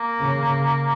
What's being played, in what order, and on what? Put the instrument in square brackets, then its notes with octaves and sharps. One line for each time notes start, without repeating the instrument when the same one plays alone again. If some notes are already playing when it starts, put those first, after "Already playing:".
Already playing: [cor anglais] A#3
[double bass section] C#3